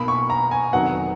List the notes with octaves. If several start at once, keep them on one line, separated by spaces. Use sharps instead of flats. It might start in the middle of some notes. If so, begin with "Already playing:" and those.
Already playing: B1 B2 A#3 B5
C#6
A#5
G#5
F1 F2 D#3 F#3 B3 F#5